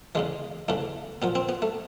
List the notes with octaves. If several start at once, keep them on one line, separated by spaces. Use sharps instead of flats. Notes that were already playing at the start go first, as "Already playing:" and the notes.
E2 C#3 E3 G#3
E2 C#3 E3 A3
A#2 F3 B3
C4
B3
A3